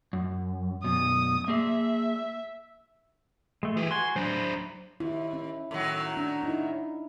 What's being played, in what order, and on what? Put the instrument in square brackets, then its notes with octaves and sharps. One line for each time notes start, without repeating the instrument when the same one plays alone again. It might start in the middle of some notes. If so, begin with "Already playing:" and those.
[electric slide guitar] F#2
[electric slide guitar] F#2 B2 [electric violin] D#6
[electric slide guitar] A#3 G#4 [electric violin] E5
[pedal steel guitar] G#3 A3
[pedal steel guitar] E3 [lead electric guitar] G4 G#4
[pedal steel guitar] F#4 G#5 [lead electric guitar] C6
[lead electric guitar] F#3 D4 [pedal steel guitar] C5 A#5 B5
[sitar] D#2 [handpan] E4
[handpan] C#4
[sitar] A2 D#3 F#3
[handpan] D4
D#4 E4